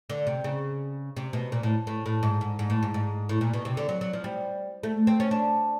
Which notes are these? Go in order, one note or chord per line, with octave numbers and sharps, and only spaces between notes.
D3
C3
C#3
C3
B2
A#2
A2
A2
A2
G#2
G#2
G#2
A2
G#2
G#2
A2
A#2
B2
C3
D3
F#3
F#3
F3
G3
A3
C4
C#4
D4